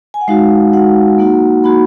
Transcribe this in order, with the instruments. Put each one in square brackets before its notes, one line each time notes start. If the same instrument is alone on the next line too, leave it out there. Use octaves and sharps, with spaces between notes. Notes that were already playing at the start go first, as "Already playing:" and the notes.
[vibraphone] G#5
F#5
G#3 D#4 F#4 F5
G#3 D#4 F#4 F#5
A#3 D#4 F#4
A#3 D#4 F#4 B5